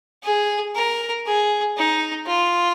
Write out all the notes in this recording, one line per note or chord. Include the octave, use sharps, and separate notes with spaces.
G#4
A#4
G#4
D#4
F4